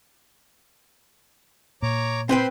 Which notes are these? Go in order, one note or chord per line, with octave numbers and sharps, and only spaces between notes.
A#2 C#5 A#5 D6
C4 B4 C5 G5 B5 C6